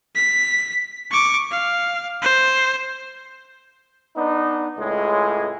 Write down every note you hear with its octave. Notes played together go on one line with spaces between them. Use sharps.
B6
C#6 D6
F5
C5
B3 D4 D#4
C#2 A2 G#3